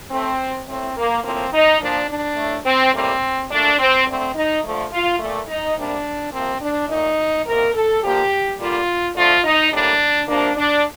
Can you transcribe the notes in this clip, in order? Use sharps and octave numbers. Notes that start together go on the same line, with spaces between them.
A2 A3 C4
A2 A3 C4
A#3
A2 F3 A#3 C4
D#4
A#2 F3 A#3 D4
D4
A2 A3
C4
A2 G3 A#3 C4
A#2 A3 D4
C4
D3 A3 C4
D#4
D3 F3 A3
F4
A#2 A3
D#4
C3 G3 A#3 D4
C3 F3 A#3 C4
D4
A#2 A3 D#4
C3 D#3 A#3 A#4
A4
D3 F3 A#3 G4
D3 G3 A#3 F4
D3 F3 A3 F4
D#4
A2 G3 A#3 D4
C3 F3 A#3 D4
D4